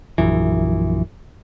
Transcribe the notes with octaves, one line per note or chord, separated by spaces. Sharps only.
A#1 F#2 E3